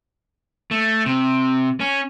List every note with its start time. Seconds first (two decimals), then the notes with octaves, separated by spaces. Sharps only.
0.71 A3
1.06 C3
1.81 C#4